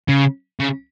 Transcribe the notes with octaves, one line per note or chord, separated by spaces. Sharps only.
C#3
C#3